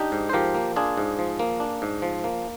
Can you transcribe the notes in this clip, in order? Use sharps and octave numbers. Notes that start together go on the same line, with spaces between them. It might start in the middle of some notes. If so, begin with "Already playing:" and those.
Already playing: D4 D#4 G4
G#2
C5
F3 G4 A#4
A#3
D4 F4 G#4
G#2
F3
A#3
D4
G#2
F3
A#3